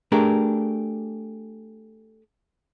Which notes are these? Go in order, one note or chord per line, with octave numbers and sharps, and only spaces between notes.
A3 D4 G4 G#4 A#4